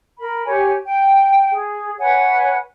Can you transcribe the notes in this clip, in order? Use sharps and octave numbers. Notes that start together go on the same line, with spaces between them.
A#4 B5
G4 C#5 G#5
G5
G#4
B4 C#5 F#5 G#5